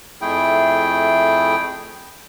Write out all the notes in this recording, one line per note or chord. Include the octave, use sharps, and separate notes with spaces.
F2 A3 E4 G#4 G5